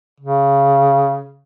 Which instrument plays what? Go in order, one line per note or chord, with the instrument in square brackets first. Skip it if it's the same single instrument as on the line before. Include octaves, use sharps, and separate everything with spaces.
[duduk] C#3